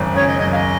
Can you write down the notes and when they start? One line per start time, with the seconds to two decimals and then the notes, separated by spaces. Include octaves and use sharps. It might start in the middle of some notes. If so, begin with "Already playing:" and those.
Already playing: G#1 F#2
0.14 C#3 C#5
0.27 D#5
0.39 F#2 D#5
0.51 F5
0.55 D#5